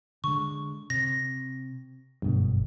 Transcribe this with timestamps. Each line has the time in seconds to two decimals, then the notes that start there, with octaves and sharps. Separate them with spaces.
0.24 D3 G#3 C#6
0.90 C3 A#6
2.22 G1 F#2 B2 A3